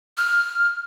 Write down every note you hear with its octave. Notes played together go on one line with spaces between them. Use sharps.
F6